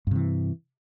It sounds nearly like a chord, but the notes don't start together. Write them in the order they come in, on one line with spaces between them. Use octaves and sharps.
G2 C3 E3